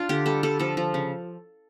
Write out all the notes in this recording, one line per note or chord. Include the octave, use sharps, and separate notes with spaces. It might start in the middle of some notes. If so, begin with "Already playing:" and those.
Already playing: D4 F4
D3 G4
G3 A4
G3 A4
F3 A4
F3
C#3